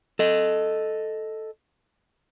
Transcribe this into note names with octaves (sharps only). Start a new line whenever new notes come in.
A4 D#5